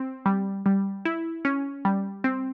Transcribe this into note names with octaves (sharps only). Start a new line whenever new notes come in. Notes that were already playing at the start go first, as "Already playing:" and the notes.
Already playing: C4
G3
G3
E4
C#4
G3
C4